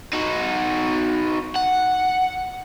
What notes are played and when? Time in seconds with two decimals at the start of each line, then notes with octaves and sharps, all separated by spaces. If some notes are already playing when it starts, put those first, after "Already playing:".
0.13 D#4 F#4
1.56 F#5